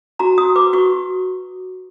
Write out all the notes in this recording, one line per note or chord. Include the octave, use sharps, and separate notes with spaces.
F#4 A#5
F#4 D#6
B4 D6
F#4 C#6